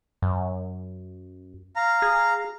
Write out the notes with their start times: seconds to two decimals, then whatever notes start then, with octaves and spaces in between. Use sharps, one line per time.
0.22 F#2
1.76 F5 A#5
2.02 G#4